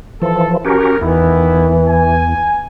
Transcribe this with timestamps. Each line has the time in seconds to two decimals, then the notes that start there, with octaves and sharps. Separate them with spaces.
0.22 E3 F3 A4
0.65 C#4 F#4 G4 A#4
1.01 E2 D#3 E3 B3 E4
1.89 G#5